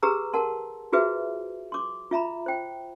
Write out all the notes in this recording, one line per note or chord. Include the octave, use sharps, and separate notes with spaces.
G4 G#4 B4 A#5 E6
A#4 F#5 A5 C6
F4 F#4 G#4 B4 C5 E5
C6 D6
F4 E5 A#5 B5
C5 G5